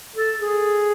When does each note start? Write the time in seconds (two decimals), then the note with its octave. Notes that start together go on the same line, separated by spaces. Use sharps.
0.16 A4
0.40 G#4